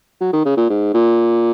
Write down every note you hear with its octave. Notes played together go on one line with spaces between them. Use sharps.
F#3
D#3
C#3
A#2
G#2
A#2